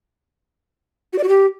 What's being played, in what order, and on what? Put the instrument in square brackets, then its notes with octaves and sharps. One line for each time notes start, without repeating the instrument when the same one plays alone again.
[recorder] F#4
D5
F#4
G4